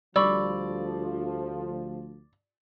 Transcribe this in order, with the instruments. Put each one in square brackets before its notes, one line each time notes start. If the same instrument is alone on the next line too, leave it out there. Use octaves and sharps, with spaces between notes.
[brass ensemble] D2 F3 [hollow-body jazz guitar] G3 [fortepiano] D5 [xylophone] B5 C#6 E6